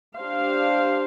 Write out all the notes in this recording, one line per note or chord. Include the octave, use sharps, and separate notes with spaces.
D4 G4 C5 F5